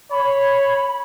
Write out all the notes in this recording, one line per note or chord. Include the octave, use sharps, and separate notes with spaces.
C#5 B5